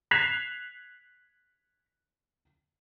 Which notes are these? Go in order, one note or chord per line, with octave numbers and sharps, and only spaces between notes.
F#6 G#6 B6 C7 E7 F7